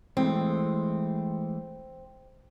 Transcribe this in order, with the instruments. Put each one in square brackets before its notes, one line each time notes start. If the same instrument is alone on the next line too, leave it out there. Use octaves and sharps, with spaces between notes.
[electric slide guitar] E3 G#3 A3 [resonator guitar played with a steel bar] C4